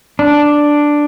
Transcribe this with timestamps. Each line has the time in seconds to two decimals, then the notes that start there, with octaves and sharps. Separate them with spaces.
0.19 D4